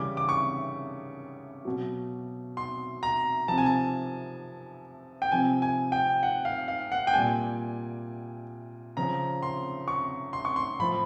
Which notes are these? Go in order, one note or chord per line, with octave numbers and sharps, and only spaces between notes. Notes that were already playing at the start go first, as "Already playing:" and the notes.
Already playing: C#3 E3 G3 D6
D6
C#6
B2 F#3
C6
A#5
C3 F3 A5
G#5
A5
G5
C3 F3 G#5
G#5
G5
F#5
F5
F5
F#5
G5
A#2 G3 G#5
C#3 F3 A#5
C6
C#6
C6
C#6
C6
A2 F3 B5